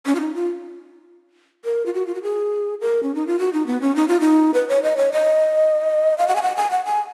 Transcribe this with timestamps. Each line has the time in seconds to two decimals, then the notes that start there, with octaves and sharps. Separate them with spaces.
0.06 C#4
0.15 F4
0.20 D#4
0.35 F4
1.65 A#4
1.86 F4
1.94 F#4
2.07 F4
2.15 F#4
2.23 G#4
2.81 A#4
3.03 C#4
3.15 D#4
3.27 F4
3.39 F#4
3.53 D#4
3.67 B3
3.82 C#4
3.96 D#4
4.08 F4
4.20 D#4
4.54 B4
4.69 C#5
4.83 D#5
4.97 C#5
5.12 D#5
6.18 F5
6.28 F#5
6.36 G#5
6.42 F#5
6.57 G#5
6.71 F#5
6.85 G#5